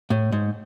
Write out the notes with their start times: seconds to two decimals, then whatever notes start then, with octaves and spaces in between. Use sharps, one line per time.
0.10 A2
0.32 G#2